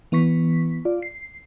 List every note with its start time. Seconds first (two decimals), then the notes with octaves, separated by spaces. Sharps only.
0.12 E3 B3 C#6 B6
0.85 F4 D5
1.02 C7